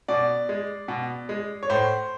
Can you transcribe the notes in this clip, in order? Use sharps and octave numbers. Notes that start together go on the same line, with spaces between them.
B2 D5
G#3
B2
G#3
C#5
A2 C5